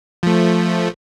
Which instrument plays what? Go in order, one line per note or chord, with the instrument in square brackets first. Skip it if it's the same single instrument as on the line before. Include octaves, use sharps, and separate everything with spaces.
[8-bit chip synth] F3 A3